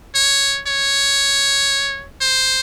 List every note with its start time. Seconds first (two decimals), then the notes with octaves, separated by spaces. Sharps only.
0.15 C#5
0.67 C#5
2.21 C5